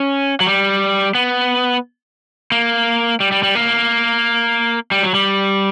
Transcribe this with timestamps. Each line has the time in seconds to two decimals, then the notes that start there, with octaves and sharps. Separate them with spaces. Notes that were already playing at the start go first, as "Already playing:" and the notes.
Already playing: C#4
0.40 F#3
0.47 G3
1.15 B3
2.52 A#3
3.20 G3
3.32 G3
3.43 G3
3.55 A#3
4.91 G3
5.02 F#3
5.14 G3